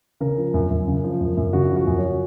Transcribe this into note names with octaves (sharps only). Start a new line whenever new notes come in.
C#3 A#4
F3
F#2
F#2
C#3
F3
F#2
F#2
C#3 F#4
F3
F#4
F#2
C#5